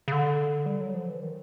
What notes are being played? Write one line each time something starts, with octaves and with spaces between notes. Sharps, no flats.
C#3
D3
G3
F#3
F3
E3
D#3